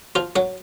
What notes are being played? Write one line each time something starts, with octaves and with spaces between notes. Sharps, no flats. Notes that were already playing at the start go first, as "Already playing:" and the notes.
F3 F4
F#3 F#4